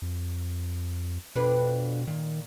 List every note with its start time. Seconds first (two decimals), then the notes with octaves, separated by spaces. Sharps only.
0.02 F2
1.35 F2 B2 D4 B4
2.07 A#2 D#3